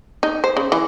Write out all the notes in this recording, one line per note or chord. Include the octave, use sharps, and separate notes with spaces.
D#4
C5
C#3
E3